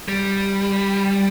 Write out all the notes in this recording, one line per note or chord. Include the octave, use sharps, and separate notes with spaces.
G3